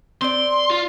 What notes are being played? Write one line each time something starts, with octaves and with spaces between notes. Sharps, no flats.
C4 D5 C6
F4